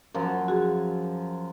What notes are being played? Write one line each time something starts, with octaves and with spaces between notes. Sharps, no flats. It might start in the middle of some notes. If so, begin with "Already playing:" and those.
F#2 F3 A#4
F#4 G#4